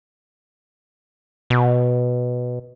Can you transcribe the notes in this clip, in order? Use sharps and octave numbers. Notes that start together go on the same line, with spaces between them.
B2